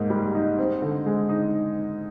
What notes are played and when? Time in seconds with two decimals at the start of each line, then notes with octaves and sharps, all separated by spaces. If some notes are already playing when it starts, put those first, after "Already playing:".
Already playing: G#2 A#3
0.10 G3
0.35 D#4
0.58 C4
0.82 D3
1.06 G#3
1.29 D#4